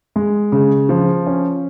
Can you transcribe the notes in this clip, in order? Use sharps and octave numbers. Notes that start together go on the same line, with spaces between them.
G#3
C#3
F3
C#4